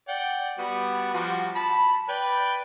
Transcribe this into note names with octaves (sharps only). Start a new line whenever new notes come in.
D5 F#5 G5
G3 B3 F#4
F3 G3 F#4
A5 B5
B4 D5 G5